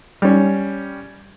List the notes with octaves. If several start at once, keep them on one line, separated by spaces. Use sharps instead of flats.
G3 C#4